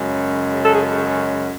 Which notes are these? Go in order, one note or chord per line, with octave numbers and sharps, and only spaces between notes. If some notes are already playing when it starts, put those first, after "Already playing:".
Already playing: F#2 C#3 G#3
A4
G#4